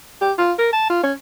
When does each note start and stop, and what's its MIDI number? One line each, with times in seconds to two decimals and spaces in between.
0.22 0.32 67
0.38 0.53 65
0.59 0.70 70
0.73 0.89 81
0.90 1.02 65
1.03 1.13 61